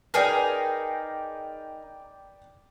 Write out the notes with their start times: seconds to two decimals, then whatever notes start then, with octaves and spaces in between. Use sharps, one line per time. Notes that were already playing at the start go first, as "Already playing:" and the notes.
0.14 D#4 G#4 A#4 B4 D5 G5